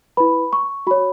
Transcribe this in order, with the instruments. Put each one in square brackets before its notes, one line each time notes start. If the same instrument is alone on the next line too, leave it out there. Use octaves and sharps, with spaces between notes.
[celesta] E4 B4 B5
C#6
F#4 C#5 B5